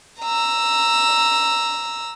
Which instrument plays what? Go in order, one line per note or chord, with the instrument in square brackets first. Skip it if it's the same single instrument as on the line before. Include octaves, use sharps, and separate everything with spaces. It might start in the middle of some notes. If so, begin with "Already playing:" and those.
[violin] A#5 E6